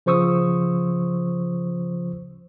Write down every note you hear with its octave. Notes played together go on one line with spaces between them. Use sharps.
C#3 F3 C5 C#6 D#6 E6